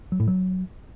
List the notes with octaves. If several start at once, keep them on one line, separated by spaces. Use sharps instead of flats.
F#3
A2
F#3